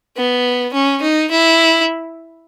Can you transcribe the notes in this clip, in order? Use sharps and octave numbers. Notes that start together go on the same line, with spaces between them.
B3
C#4
D#4
E4